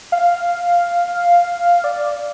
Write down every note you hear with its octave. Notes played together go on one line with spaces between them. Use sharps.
F5
D5